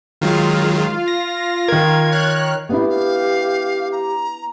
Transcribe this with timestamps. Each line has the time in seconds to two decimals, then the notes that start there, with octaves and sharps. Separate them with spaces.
0.21 D#3 F#3 G#3 F4 F5
1.08 A#6
1.68 D#3 A#4 G#6
2.11 C#5 F6 F#6
2.69 B3 D4 E4 G4 F5
2.89 F5
3.92 A#5